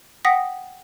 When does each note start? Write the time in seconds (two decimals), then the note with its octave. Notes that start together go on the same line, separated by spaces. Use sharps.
0.25 F#5 G5 D#6 A#6 B6